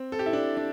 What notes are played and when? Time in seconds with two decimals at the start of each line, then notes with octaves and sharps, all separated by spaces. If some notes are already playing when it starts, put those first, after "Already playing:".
Already playing: C4
0.12 A4
0.19 G4
0.26 E4
0.33 D4
0.57 D4